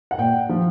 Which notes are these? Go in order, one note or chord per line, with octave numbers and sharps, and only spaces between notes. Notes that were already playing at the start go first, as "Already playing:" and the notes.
F#5
A#2 G5
F3